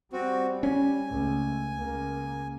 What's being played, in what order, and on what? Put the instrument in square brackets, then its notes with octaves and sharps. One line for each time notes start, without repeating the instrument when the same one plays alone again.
[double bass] G3 [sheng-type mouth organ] C4 F#4
[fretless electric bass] C#4 [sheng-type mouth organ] G#5
[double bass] C#2 A3
C#2 A#3